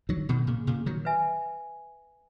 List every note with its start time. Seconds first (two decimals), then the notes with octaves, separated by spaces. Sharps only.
0.09 D#3 F#3
0.29 B2 D#3
0.47 A#2 C#3
0.67 A#2 C#3
0.86 D#3 F#3
1.05 B4 E5 G#5